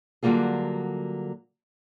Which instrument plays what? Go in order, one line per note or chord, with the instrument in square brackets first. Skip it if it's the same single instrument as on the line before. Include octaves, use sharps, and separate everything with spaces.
[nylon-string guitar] D3 F#3 G3 A#3 F4 G#4